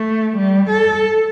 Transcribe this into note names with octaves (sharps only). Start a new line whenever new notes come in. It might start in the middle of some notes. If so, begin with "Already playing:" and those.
Already playing: A3
G3
A4